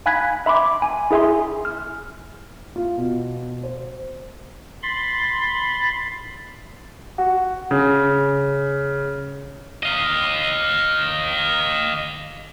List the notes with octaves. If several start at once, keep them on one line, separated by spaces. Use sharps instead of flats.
F5 G#5 B5 F#6 G#6 B6
E5 B5 C6 D6
G#5
E4 G#4 E5 G#5 C6
F6
F4
B2
C5
B5 C6 A6
F#4
C#3
D#5 F5